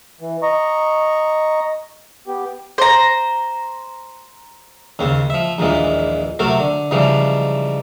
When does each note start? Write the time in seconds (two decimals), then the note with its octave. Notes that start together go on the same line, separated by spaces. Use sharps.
0.21 E3
0.42 D#5 A#5 C#6
2.27 B3 G4
2.78 C5 A#5
4.99 D#2 C#3 C4
5.30 F3 E5
5.58 A#1 D#2 A#2 E3 G#3
6.39 C3 F#3 A3 A4 A#4
6.60 D3
6.91 G#2 C#3 E3 F3 G3